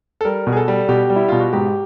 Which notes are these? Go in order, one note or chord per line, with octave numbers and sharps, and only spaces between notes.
A4
G3 A#4
B2
G#4
A4
G3
B2 G4
G3
E4
B2 F4
F#4
G#2 G4